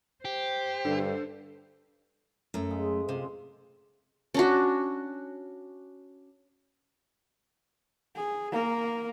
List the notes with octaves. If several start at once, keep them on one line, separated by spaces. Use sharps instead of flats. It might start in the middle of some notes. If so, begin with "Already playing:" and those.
G4 C5
G2 D3
F#2 A3
C#3 G#3 G#4
C3 C4 F4 C6
C#4 D4 F#4
G#4
A#3 A#4